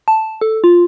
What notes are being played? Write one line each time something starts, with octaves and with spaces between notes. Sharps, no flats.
A5
A4
F4